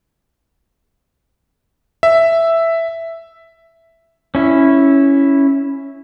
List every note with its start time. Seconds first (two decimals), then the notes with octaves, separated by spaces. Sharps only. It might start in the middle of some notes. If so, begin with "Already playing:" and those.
2.03 E5
4.35 C#4 E4